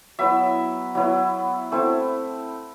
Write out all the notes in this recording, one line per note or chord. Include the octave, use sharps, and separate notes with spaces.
F#3 B3 E4 E5
F#3 B3 E4
A3 C4 E4